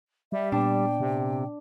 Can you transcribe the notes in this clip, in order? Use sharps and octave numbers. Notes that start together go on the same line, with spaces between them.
G3 E5
A#2 B3 D4 G5
C3